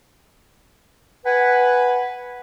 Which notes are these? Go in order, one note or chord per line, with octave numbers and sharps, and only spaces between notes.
B4 F#5 G#5